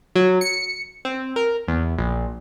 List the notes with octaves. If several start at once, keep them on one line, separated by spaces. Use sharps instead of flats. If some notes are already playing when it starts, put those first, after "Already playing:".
F#3
C#7
C4
A#4
E2
A#1